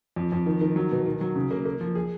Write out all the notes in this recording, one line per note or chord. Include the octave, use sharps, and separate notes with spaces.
F2
F2
D#3
D#3
F#3
B2
D#3
F#3
C#3
A#3
A#3
F3
G#4